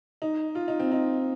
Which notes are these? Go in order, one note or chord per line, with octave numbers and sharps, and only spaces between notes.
D#4
F4
D#4
C4
D#4